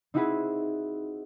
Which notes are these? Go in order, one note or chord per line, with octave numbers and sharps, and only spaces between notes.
C4 D#4 E4 F#4 G#4 B4